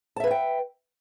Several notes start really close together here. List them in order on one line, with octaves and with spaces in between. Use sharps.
A5 E5 B4 F5 G5